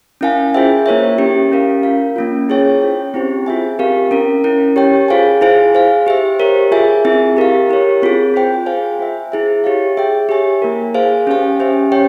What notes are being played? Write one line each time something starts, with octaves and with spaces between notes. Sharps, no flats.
C#4 E4 A#4 F5 G#5
F4 G#4 C5 E5 G5
A#3 E4 A#4 C#5 E5
C#4 E4 G4
C#4 G4 A#4 F5
F4 A#4 F5
A#3 C#4 F4
E4 G#4 C#5 G5
C#4 F4 C5 G5
C4 E4 G4 C5
F4 G#4 E5 G#5
C4 G4 A#4 F5
C#4 E4 A#4
C#4 E4 A#4
G4 C#5 G5
F4 G#4 C5 F5 G#5
E4 G#4 C5 F5 G#5
G#4 C5 F5
G4 C5 E5
G4 A#4 C#5
F4 G#4 E5 G#5
C4 E4 G#4 E5
G4 A#4 F5
E4 G4 A#4 C#5
C4 F4 G#4
F4 C5 G5
G#4 C5 F5 G#5
F4 C5 E5
E4 G#4 E5
G4 C#5 F5
G#4 E5 G5
G4 C#5 E5 G#5
A#3 E4 A#4
G#4 C5 F5 G#5
C#4 G4 C5 F5 G#5
C#4 G4 C5 E5
G4 C#5 G5